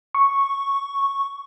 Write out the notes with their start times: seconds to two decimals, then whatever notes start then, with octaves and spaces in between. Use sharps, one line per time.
0.15 C#6